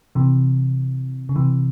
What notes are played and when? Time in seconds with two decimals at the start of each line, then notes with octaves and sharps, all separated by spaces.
0.15 C3 E3
1.29 C#3
1.36 C3 E3